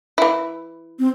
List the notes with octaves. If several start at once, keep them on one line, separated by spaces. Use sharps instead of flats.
E3 E4
C4